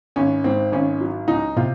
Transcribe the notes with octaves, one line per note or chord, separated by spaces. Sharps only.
G#1 C#4
G#2 C4
G#1 C#4
F#3
C#2 D#4
C3 F4